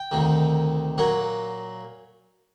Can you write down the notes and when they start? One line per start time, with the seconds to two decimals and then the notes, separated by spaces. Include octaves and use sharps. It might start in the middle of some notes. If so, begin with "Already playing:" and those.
Already playing: G5
0.11 D2 C3 D#3
0.98 A#2 F#3 A#3 F#5